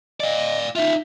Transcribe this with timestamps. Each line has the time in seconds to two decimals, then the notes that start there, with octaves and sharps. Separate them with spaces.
0.20 D5 D#5 F5
0.76 D#4 F4 E5